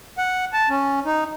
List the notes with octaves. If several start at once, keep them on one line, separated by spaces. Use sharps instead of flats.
F#5
A5
C#4
D#4